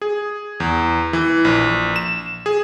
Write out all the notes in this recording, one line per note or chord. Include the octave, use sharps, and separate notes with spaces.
G#4
E2
E3
A#1
E7
G#4